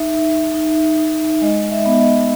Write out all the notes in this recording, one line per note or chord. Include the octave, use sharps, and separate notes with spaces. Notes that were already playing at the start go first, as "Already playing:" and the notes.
Already playing: D#4 E5
D#4
D#4
D#4
G#3 D#5
E5
B3
D#5